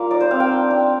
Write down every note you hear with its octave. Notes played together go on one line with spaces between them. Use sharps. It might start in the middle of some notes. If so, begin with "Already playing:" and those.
Already playing: G3 A#3 F4 F5
D#4 D5
C5
C4 F5
G5
D4
D4